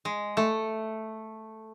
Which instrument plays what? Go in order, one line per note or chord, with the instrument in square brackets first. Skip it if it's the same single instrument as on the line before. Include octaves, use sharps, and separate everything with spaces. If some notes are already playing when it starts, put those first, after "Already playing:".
[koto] G#3
A3